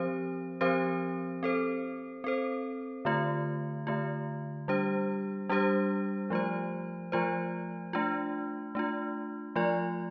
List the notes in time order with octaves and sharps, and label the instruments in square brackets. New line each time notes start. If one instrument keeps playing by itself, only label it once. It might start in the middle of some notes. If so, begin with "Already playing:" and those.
Already playing: [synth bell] F3 C4 G4 C5
F3 C4 G4 C5
C4 A4 C5
C4 A4 C5
D3 A3 F4
D3 A3 F4
G3 D4 G4 C5
G3 D4 G4 C5
F3 A3 F4 C5
F3 A3 F4 C5
A3 D4 F4
A3 D4 F4
F3 A3 F4 D5